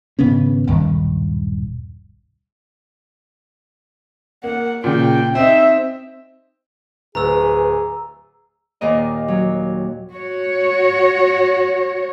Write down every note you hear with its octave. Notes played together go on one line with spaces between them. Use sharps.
G#1 C#3 B3 C#4
D#1 B1 G2 D#3
A#3 F#5
A#2 C#3 G5
C4 D#4 E5
D1 G#4 B4 A#5 E6
D#2 A#2 A#4 D#5
F#3
F#4 C#5